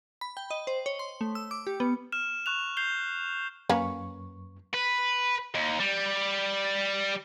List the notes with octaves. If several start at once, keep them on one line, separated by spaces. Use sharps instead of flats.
B5
G5
D#5
C5
C#5
C6
A3
E6
D6
G4
B3
F6 E7
C#6 F#6 F7
G6 C7 F7 G7
F#2 A#3 C#4 B4 C#6
B4
D#2
G3